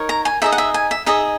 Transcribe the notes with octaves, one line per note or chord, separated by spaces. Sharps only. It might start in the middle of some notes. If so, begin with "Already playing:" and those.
Already playing: D#4 A#4 C#5
A#5
G#5
D#4 G#4 D#5 E5
F#5
E5
G#5
E5
D#4 G#4 D#5 E5